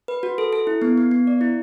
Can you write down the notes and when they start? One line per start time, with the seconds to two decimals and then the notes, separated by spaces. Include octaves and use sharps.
0.08 B4
0.23 F#4
0.38 A4
0.53 A4
0.67 E4
0.82 B3
0.98 B3
1.11 B3
1.27 D5
1.41 E4